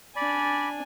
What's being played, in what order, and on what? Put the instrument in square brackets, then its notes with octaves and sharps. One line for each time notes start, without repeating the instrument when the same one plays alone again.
[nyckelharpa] D4 G#5 [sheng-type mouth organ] D5 B5